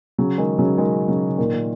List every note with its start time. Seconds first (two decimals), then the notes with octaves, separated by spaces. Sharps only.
0.18 C#3 F#3
0.38 D#3 G#3
0.58 C#3 F#3
0.78 D#3 G#3
1.08 C#3 F#3
1.30 C#3
1.38 A#2 D#3
1.53 A#2